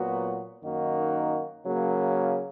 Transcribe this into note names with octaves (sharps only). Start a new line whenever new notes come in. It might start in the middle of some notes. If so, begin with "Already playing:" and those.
Already playing: A#2 F#3 B3 F#4
F#2 D#3 A#3 D#4 F#4
C#3 F#3 A#3